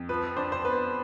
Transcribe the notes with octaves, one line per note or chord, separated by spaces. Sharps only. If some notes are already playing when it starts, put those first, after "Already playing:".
Already playing: F2
F3 B4
D4 C5
C5
B3 B4